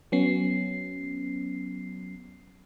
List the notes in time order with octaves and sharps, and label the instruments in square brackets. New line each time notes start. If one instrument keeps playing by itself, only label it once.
[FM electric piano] F#3 B3 C#4 C7